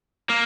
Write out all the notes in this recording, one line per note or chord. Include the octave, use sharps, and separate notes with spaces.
A#3